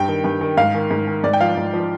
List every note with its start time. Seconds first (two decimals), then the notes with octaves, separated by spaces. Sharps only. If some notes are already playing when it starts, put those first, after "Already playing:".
Already playing: G2 G5
0.08 D#3
0.24 G2
0.41 D#3
0.57 G#2 F5
0.74 D#3
0.91 G#2
1.07 D#3
1.24 G#2 D5
1.33 G5
1.40 F3 F5
1.57 G#2
1.73 F3